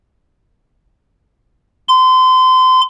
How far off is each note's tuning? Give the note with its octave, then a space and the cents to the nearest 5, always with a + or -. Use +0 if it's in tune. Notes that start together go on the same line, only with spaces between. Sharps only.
C6 -30